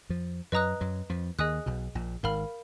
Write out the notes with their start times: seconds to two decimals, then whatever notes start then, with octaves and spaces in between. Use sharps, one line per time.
0.09 F2 F3
0.52 F#2 F#3 B4 D#5 A#5 D#6 F#6
0.81 F#2 F#3
1.09 F2 F3
1.38 D#2 D#3 G#4 D#5 G#5 D#6 F#6
1.66 B1 B2
1.95 A#1 A#2
2.23 G#1 G#2 A#4 F5 B5 F6